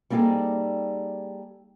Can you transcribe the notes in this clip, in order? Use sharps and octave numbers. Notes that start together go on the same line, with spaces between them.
G3 A#3 C4 D#4 G#4 A4